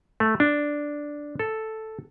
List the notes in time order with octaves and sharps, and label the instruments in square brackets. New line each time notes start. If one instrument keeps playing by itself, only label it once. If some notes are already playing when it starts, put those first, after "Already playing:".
[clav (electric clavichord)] A3
D4
A4